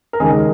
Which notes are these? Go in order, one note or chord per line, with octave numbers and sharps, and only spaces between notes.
A#4
D#2 C#3 G#3 D#4 G#4